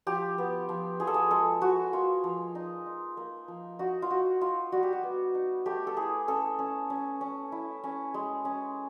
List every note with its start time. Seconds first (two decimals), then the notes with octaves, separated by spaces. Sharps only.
0.06 F3 G4
0.38 B3
0.69 F3
1.00 F3 G#4
1.07 A4
1.14 G#4
1.31 G#3 A4
1.62 G#3 F#4
1.93 A#3 F4
2.24 F3
2.55 D#4
2.86 D#4
3.17 A#3
3.48 F3
3.79 D#4 F#4
4.02 F4
4.10 D#4 F#4
4.41 D#4 F4
4.72 G3 F#4
4.83 G4
4.93 F#4
5.03 B3
5.35 D#4
5.66 A3 G4
5.87 A4
5.96 E4 G#4
6.28 C#4 A4
6.59 C#4
6.90 C#4
7.21 C#4
7.52 E4
7.84 C#4
8.14 G#3
8.45 C#4